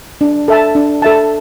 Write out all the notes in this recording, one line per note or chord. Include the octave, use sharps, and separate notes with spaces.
D4
A4 E5 A5
D4
A4 E5 A5